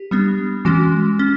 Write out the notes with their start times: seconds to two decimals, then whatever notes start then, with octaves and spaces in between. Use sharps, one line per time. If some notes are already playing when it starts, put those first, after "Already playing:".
Already playing: G4
0.11 G3 B3 D4
0.65 E3 G#3 C#4 F#4
1.19 C#4